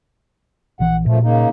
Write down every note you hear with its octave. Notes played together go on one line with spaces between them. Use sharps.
A#1 E3 F#5
F#2 A#2 F3 A3
C#3 A#3 D#4